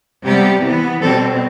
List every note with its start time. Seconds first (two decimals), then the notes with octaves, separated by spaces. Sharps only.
0.25 C3 G3 B3 G4
0.64 E3 B3
1.02 B2 G3 C4 A4